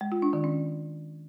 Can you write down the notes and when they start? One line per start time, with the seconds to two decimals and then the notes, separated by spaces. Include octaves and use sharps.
0.01 G#3
0.12 F4
0.22 D4
0.33 D#3
0.44 C#4